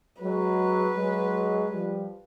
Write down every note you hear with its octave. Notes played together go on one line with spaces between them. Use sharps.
F#3 G#3 B4
F#3 G#3
F3 G3